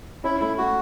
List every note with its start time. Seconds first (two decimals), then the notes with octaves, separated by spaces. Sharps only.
0.24 C#4 E4
0.40 A3 E4
0.58 A3 F#4